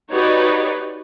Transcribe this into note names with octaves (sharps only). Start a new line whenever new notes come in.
D#4 F#4 G4 B4 C#5 D5